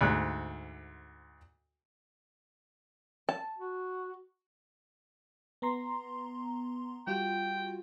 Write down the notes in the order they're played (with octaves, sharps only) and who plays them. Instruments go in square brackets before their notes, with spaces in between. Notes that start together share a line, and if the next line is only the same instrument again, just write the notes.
[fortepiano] D2 G#2 F#6
[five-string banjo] A5
[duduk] F#4
[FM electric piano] B3 A#5 C6
[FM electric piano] G3 F4 F#4 [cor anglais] G5